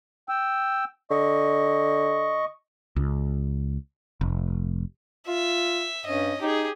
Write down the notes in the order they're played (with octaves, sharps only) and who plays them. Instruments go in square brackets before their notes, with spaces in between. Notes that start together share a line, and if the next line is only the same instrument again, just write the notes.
[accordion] G5 E6
[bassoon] D3 [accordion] D#5 C#6
[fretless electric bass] C#2
F1
[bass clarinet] F4 [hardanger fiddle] E5
[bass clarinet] G2 [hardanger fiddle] C#4 D#5
[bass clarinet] D#4 [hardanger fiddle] G4 G#4